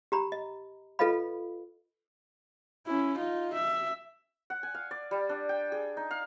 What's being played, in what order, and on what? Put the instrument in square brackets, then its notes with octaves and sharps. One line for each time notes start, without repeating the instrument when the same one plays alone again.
[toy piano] G4 A#5 B5
D#5
F4 A4 B4 D#5 F5 B5
[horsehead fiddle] C#4 E4
D#4 F4
E5
[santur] F#5
G#5
F5
D5
G3
D4
G5
G#4
D#4
F5